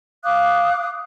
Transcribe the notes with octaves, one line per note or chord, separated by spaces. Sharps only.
F5 D6 D#6 F#6